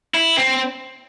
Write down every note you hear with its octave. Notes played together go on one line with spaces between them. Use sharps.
E4
C4